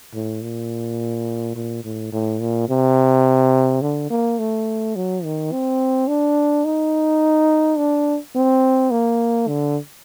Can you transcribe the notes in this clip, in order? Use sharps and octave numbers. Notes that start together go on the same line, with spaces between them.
A2
A#2
A#2
A2
A2
A#2
C3
D3
A#3
A3
F#3
D#3
C4
D4
D#4
D4
C4
A#3
D3